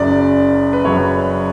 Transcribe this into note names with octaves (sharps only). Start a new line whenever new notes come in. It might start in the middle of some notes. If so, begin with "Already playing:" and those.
Already playing: F#1 F#2 C#3 F#3 D5
B4
F#1 F#2 C#3 F#3 C#5